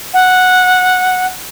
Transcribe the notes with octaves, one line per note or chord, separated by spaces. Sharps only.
F#5